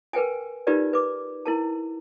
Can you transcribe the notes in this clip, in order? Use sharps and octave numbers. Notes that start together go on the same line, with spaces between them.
A#4 B4 G5 G#5
D#4 F4 G4 A#4 B4 D5
B4 D6
E4 A#4 A5